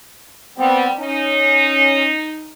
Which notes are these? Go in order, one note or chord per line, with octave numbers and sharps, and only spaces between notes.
G3 B3 C4
C#4 D#4